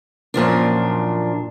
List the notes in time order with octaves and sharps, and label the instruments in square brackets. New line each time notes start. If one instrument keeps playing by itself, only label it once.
[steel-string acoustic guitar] F#2 A#2 F3 D4